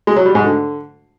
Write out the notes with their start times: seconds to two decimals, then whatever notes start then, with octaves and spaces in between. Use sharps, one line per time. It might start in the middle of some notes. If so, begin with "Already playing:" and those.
0.07 G#3
0.16 F#3
0.26 G3
0.35 G#2
0.44 D3